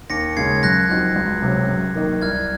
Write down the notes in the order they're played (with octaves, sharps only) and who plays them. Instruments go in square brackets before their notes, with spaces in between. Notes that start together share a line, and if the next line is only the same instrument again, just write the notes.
[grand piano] D#2 [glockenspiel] A#6 C#7
[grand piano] C#3 G#3 C#4 [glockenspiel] G#6 C7
[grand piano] F#2 [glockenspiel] F#6 A#6
[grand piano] F3 C4 D#4 F#4
C#2
C3 F#3 C#4
F#2
D#3 A#3 D#4
[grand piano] C2 [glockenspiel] F6 G#6